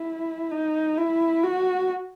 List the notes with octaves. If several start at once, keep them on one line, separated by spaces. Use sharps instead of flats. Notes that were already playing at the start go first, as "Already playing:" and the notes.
Already playing: E4
D#4
E4
F#4